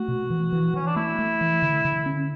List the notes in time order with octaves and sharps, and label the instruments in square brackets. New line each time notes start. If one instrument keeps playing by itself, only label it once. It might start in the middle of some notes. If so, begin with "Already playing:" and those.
Already playing: [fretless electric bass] A3 [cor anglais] F#4
[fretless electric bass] B2
E3
E3
[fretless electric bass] E3 [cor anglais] C#4
[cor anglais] D4
[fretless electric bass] A3 [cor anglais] E4
[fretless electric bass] A3
E3
D3
D3
C#4